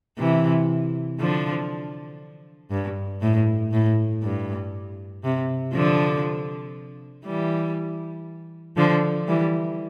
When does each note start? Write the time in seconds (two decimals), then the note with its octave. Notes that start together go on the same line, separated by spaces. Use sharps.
0.18 C3 E3
1.20 D3 F3
2.71 G2
3.22 A2
3.73 A2
4.22 G2
5.24 C3
5.74 D3 F3
7.25 E3 G3
8.77 D3 F3
9.27 E3 G3